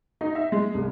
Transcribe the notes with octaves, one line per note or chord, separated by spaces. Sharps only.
D#4
E5
G#3
C2